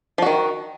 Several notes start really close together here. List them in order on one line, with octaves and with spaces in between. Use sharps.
F3 F#4 D#3